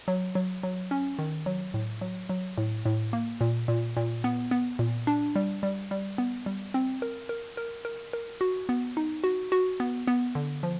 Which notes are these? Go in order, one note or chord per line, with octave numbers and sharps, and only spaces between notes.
F#3
F#3
F#3
C#4
D#3
F#3
A2
F#3
F#3
A2
A2
A#3
A#2
A#2
A#2
B3
B3
A#2
D4
G3
G3
G3
B3
G3
C4
A#4
A#4
A#4
A#4
A#4
F#4
B3
D#4
F#4
F#4
B3
B3
D3
F3